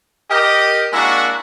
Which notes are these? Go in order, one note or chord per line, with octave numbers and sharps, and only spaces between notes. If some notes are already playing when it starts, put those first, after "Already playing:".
G4 A#4 D#5
G#3 A#3 D4 E4 F#4